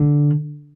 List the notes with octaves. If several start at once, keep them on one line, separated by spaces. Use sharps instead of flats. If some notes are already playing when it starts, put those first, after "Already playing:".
Already playing: D3